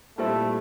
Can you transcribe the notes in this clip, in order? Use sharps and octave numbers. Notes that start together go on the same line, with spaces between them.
A#2 G3 A3 C4 E4